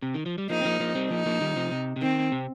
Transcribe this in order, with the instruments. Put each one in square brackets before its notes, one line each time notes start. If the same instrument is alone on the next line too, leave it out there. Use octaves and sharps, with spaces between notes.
[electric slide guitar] C3
D#3
F3
G3
[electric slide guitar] F3 A#3 [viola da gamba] D#4
[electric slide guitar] C4
F3 A#3
F3 A#3
G3 C4
[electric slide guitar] F3 A#3 [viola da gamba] D#4
[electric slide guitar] F3 A#3
D#3 G3
C3 F3
C3
C3
[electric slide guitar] D#3 [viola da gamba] C4
[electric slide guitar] C3